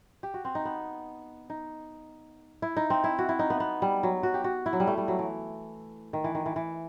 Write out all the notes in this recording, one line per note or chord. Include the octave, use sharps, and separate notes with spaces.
G4
F#4
C4
D#4
B3
D#4
E4
D#4
C4
E4
F#4
E4
D#4
B3
B3
G3
F#3
F#4
G4
F#4
E4
F#3
G3
A3
G3
F#3
E3
D#3
E3
D#3
E3
E3